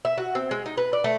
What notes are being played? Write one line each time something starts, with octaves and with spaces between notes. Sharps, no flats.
E5
F#4
C4
G#3
D#4
B4
D5
A3